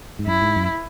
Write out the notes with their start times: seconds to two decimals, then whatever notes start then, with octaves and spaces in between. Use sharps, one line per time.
0.19 G#2
0.27 F#2 E4
0.42 G#2
0.56 F#2